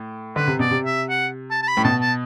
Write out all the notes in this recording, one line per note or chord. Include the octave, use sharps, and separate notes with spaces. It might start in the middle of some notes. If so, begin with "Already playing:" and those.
Already playing: A2
D3 B4
C3
B2 D5
C3
E5
F#5
A5
A5
B5
A2
B2 A5
A5